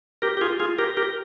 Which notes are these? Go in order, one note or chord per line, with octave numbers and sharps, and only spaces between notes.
G4 A#4
G4
F4 G#4
F4 G#4
G4 A#4
G4 A#4